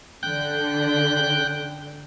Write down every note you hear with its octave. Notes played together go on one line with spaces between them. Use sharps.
D3 G5 F#6 G6